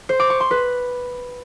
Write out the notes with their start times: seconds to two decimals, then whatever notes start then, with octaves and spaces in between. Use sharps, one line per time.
0.09 C5
0.20 D6
0.30 C#6
0.40 C6
0.51 B4